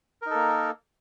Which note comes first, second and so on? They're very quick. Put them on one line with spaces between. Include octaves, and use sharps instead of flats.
A#4 D#4 A4 A#3